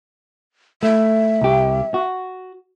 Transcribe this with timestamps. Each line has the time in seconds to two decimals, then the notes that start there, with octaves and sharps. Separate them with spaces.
0.83 A3 E5
1.41 C2 G4
1.94 F#4